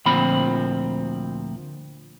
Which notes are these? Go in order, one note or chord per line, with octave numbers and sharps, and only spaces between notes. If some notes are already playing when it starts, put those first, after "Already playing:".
D2 A#2 F3 C4 B5